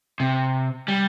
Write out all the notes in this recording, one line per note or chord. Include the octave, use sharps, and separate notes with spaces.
C3
G3